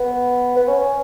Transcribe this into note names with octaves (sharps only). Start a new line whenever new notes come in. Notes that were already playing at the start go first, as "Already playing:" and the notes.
Already playing: B3
B3
C#4